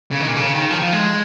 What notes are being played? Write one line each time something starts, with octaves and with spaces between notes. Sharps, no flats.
C#3
D#3
A#2
C#3
D#3
F3
F3
G#3